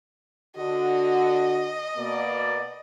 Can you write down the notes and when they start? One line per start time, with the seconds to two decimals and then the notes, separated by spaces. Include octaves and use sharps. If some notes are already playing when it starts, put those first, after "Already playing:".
0.57 D3 F#4 D#5
1.96 B2 A#3 D5